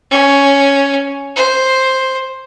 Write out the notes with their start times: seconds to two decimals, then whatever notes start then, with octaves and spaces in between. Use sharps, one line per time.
0.11 C#4
1.36 C5